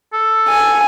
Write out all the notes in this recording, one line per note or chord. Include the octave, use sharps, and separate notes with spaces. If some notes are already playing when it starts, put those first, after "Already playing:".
A4
G#5